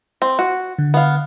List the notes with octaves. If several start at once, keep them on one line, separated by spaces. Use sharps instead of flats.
C4
F#4
D3
B3 F5